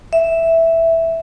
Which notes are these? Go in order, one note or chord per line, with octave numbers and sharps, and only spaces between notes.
E5